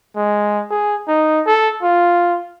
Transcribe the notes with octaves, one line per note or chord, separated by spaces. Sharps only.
G#3
G#4
D#4
A4
F4